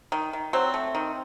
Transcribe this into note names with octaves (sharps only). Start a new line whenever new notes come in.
D#3
D#3
F#3 C4
A3
D#3